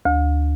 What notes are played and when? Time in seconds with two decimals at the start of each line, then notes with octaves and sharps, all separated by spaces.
0.05 D2